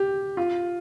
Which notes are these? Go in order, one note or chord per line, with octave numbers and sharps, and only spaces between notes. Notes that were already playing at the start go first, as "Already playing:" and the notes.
Already playing: G4
F4